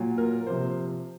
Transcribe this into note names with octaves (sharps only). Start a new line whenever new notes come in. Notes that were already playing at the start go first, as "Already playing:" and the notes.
Already playing: A#2 F#3
A#4
C3 F3 C5